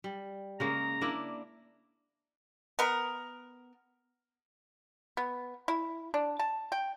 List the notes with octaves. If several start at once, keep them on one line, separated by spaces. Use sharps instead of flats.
G3
C#3 G#3 A#3 A#5
A#3 D4 E4
B3 A#4
B3
E4
D4
A5
G5